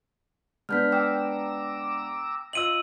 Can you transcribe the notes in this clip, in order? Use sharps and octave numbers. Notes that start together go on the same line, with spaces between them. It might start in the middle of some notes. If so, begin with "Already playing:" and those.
G#3 B3 D4 F6 G6 B6
G5 A#5 D6 E6
F4 D#5 E6 D#7 F#7